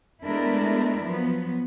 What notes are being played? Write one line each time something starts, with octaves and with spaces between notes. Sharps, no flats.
G#3 A3 B3 D4 E4 A#4
F3 F#3 B3